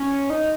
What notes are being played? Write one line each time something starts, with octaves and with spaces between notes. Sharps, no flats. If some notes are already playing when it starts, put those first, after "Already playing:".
Already playing: C#4
D#4